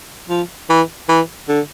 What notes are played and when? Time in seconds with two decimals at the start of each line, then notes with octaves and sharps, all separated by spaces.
0.30 F3
0.69 E3
1.09 E3
1.48 D3